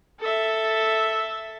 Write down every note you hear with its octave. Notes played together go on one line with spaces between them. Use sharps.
A4 E5